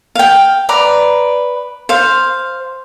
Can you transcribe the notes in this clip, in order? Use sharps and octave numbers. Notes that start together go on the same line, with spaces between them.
F5 G5
B4 D5 A#5
C5 F5